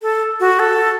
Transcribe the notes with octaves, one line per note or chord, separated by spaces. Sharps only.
A4
F#4
A4